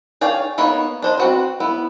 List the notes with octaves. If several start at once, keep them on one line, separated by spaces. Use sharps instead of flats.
G#4 C#5 D5 F5 G5
A#3 B3 D#4 C#5 B5
D4 C5 D#5
C4 F#4 B4
B3 E4